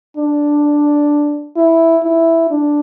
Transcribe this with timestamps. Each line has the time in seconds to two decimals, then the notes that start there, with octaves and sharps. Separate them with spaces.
0.17 D4
1.56 E4
2.03 E4
2.50 D4